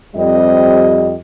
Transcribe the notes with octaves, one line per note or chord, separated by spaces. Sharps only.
F2 G3 C4 G4 D#5